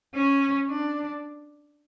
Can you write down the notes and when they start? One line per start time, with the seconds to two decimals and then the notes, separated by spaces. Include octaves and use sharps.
0.15 C#4
0.68 D4